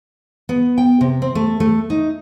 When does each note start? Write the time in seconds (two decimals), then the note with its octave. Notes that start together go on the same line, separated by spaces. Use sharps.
0.49 B3
0.78 G5
1.01 C3
1.22 C4
1.35 A3
1.60 A3
1.90 D#4